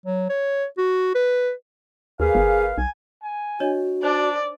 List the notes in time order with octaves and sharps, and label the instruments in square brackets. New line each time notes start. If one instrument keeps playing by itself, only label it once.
[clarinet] F#3
C#5
F#4
B4
[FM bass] D#2 [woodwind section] A#3 B4 F5 [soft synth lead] G#4
[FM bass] G1
[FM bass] B1 [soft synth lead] G#5
[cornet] G#5
[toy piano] D4 C#5 D#5 [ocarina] F#4
[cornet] D4 [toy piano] D#4 C5 [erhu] D5